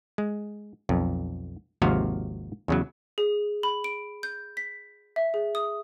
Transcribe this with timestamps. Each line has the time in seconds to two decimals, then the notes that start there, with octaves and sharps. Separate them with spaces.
0.18 G#3
0.89 B1 F2
1.82 G#1 D#2 C3 F3 F#4 F5
2.68 E2 C#3 F#3
3.18 G#4
3.63 B5
3.84 D7
4.23 G6
4.57 B6
5.16 E5
5.34 G#4
5.55 D#6